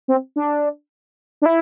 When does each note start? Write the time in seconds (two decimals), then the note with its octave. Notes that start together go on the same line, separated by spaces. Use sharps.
0.08 C4
0.36 D4
1.42 D4
1.46 E4